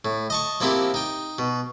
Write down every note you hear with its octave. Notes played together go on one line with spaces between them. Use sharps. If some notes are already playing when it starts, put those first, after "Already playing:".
A2
D#5 A5 C#6
F3 A#3 C4 E4 G4
D#4 G5
B2